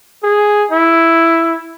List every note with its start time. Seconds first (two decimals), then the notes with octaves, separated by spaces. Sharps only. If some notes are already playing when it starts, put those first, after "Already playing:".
0.23 G#4
0.71 E4